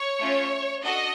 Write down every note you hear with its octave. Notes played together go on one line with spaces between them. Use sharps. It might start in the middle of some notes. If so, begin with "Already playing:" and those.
Already playing: C#5
A3 C#4 F4
D4 F#4 A4 D#5